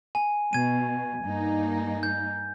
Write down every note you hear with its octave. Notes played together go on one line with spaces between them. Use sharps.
G#5
B2 G#6 D#7
G2 A#3 D#4
G6